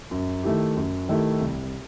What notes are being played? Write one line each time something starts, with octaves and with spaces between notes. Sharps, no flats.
F#2
D#3 A3 E4 G4
F#2
D#3 A3 E4 G4
C2